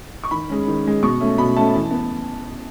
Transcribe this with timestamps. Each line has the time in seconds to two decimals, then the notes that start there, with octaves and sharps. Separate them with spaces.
0.24 C#6
0.31 D#3 B5
0.50 G#3 C#4
0.67 D#3
0.85 G#3 C#4
1.03 B2 C#6
1.20 A3 C#4
1.38 B2 B5
1.56 A3 C#4 A5
1.74 E3
1.91 B3